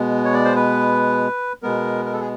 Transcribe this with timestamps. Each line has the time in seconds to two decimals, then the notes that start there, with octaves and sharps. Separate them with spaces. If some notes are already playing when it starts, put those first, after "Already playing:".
Already playing: B2 G#3 B3
0.25 C#5
0.34 D5
0.45 C5
0.56 B4
1.63 B2 G#3 B3 A#4
2.05 A#4
2.13 A4
2.21 G#4